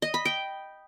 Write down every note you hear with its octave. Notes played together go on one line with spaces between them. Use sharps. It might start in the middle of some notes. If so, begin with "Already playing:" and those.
D#5
B5
G5